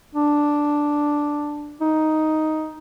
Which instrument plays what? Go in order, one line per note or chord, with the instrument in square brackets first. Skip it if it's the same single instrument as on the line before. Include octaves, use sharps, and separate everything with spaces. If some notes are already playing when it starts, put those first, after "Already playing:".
[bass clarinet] D4
D#4